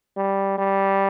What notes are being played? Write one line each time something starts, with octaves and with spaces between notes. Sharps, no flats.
G3
G3